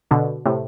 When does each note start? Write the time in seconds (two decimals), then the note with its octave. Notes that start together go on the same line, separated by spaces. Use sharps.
0.11 B2 D3
0.46 A2 C3